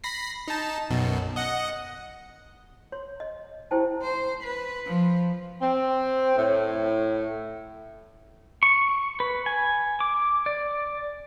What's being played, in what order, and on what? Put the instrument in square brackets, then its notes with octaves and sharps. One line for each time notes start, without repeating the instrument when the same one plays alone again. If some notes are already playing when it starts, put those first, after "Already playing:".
[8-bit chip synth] B5 A#6 C7
D#4 A5
B1 F#2 B2
D#5 F#5
[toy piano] C#5 C6
D#5
E4 G4 C5 G5 A5
[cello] C5
B4
F3
[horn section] C4
A2
[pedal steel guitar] C#6
B4
G#5
D6
D5